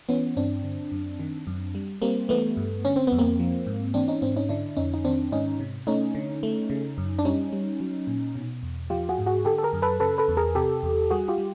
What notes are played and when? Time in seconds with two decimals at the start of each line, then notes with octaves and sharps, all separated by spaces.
0.09 E3 B3 C#4
0.37 G2 C4 D4
0.64 D3
0.92 F#2
1.20 D#3
1.47 F#2
1.75 G3
2.02 G3 A#3 C4
2.29 E3 A3 B3
2.57 G2
2.85 D3 C#4
2.96 C4
3.07 F2 B3
3.18 A#3 C4
3.39 F3
3.66 G#2
3.94 E3 C4 D4
4.08 C#4 D#4
4.22 G#2 C4 D4
4.37 C#4 D#4
4.49 D3 D4 E4
4.77 F2 C#4 D#4
4.94 D#4
5.05 D#3 C4 D4
5.32 G#2 C#4 D#4
5.60 C3
5.87 A3 C#4 D#4
6.15 D3
6.43 A3
6.70 C#3
6.98 F#2
7.19 D4
7.25 G3 C#4 D#4
7.52 G3
7.80 F#3
8.07 A#2
8.35 B2
8.63 E2
8.90 F3 F4 G4
9.09 F#4 G#4
9.18 G#2
9.26 F#4 G#4
9.45 D3 G4 A4
9.58 A4
9.63 G#4 A#4
9.73 F#2
9.82 A4 B4
10.00 C#3 A4 B4
10.18 A4 B4
10.28 E2
10.37 G#4 A#4
10.55 C3 G4 A4
10.83 E2
11.10 G3 F#4 G#4
11.28 F4 G4
11.38 G3